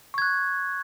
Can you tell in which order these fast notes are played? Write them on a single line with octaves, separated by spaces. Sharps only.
C#6 G#6 F#6